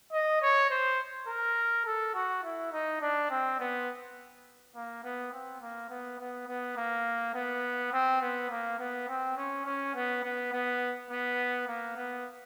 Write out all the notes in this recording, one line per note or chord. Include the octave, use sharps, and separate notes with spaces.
D#5
C#5
C5
A#4
A4
F#4
E4
D#4
D4
C4
B3
A#3
B3
C4
A#3
B3
B3
B3
A#3
B3
C4
B3
A#3
B3
C4
C#4
C#4
B3
B3
B3
B3
A#3
B3